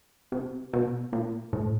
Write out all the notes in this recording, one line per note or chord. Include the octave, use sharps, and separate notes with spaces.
C3
B2
A#2
A2